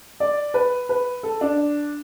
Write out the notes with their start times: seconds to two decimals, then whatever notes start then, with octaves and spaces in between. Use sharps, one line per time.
0.20 D5
0.54 B4
0.89 B4
1.23 A4
1.41 D4